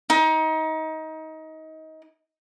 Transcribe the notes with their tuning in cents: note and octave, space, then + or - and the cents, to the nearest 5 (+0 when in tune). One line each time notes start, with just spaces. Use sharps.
D#4 +25